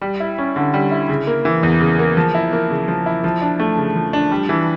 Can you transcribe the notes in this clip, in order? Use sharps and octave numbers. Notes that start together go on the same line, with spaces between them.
G3
E4
C#4
D3
G3
E4
C#3
A#3
E3
E2
C#3
A#3
F3
E4
A#3
C#3
F3
E4
F3
D4
A3
C#3
F3
D4
G3
E3